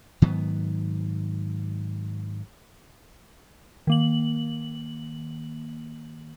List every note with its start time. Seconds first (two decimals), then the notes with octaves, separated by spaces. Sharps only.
0.22 G#2 D#3 F#3 B3
3.87 D#3 A#3 F#7